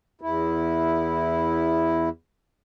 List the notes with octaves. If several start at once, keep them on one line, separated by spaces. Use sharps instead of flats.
E2 E4